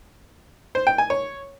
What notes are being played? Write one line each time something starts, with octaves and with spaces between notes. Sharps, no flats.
C5
G5
G#5
C#5